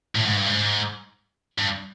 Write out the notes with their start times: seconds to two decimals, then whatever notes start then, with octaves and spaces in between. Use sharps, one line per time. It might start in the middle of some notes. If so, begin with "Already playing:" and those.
0.15 A2
0.25 G#2
0.36 G2
0.46 G#2
1.58 G2